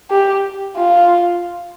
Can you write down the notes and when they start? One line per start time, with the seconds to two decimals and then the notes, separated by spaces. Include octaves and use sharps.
0.11 G4
0.77 F4